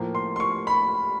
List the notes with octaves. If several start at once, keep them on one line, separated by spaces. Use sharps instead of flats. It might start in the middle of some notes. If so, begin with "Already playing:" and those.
Already playing: A2 F3 A#3
C6
C6
C#6
B5